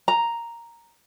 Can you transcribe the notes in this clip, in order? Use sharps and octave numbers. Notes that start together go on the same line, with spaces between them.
A#5